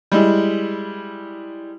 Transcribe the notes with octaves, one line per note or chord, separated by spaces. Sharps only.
G3 G#3 E4